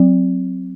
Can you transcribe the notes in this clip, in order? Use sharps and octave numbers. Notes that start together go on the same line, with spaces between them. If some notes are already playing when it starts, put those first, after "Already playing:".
Already playing: F#3 C4